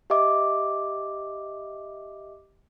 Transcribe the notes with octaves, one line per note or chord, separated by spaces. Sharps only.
G4 D#5 E5 D6